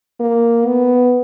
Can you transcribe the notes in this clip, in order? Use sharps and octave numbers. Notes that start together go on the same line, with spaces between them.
A#3
B3